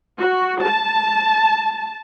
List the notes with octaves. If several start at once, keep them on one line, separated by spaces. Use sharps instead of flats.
F#4
A5